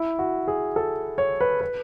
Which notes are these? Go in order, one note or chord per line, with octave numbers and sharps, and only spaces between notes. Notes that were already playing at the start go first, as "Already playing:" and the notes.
Already playing: E4
F#4
G#4
A4
C#5
B4
B4